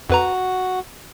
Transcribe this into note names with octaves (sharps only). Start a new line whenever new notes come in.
F2 F#4 B4 A#5